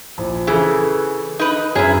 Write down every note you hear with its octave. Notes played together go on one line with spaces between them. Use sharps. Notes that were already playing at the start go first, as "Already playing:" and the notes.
A#1
C#3 E3 G#4 A4
D#4 B4
F#2 E4 G#4